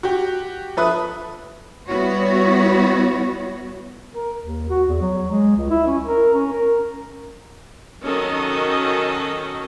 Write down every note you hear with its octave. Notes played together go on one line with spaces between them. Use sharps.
F#4 G4
F3 A4 B4 E5 D#6 F#6
G3 B3 E4 F#4 C#5
A#4
D#2
F#4
E2
F#3
G#3
C#2
E4
C#4
A#4
C#4
A#4
D#3 F#3 C#4 A4 D#5